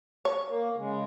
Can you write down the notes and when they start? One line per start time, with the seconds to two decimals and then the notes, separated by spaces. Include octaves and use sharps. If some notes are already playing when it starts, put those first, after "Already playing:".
0.25 C#5
0.48 A#3
0.77 C#3 G#3